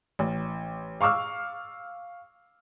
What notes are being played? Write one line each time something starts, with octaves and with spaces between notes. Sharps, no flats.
A1
F5 C#6 D6 E6 F6